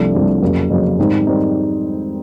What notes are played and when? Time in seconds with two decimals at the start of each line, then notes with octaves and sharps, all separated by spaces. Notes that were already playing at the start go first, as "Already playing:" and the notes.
Already playing: C2 C3 F3 A3 D4
0.13 C2 C3 F3 A3 D4
0.42 F2 C#3 F#3 A#3
0.70 F2 C#3 F#3 A#3
0.99 G#2 D#3 G3 C4 D#4
1.27 D#3 G3 C4 D#4